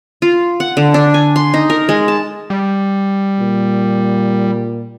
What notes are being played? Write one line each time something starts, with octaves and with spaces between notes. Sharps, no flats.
F4
F#5
D3
D4
G#5
C6
D#4
A#4
G#3
A5
G3
A#2